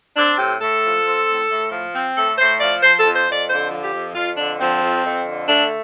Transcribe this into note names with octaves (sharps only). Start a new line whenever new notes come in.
C4 D4
A2 G4
A2 A4
F3
C4
A2
A2
F3
C4
A2 A4
A2 C5
F3 D5
F3 C5
A4
F2
C5
F2
D5
D3 C5
F3
G4
F2
F2 F4
D3 D4
F3 C4
F2
F2
D3
A3 D4